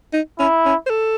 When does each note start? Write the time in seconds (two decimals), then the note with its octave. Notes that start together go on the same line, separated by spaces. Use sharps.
0.13 D#4
0.39 C#4 E4
0.65 C#4
0.86 C5
0.90 A4